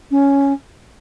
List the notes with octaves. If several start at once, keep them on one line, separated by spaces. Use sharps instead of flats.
C#4